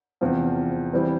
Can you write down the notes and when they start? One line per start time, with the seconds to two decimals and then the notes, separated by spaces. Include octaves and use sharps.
0.21 E2 C3 F3 C4
0.93 E3 G3 C4